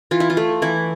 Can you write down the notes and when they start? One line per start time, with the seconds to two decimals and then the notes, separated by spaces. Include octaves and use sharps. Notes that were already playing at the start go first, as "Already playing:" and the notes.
0.11 E3 F4
0.20 E4
0.30 F4
0.37 A3
0.62 E3 E4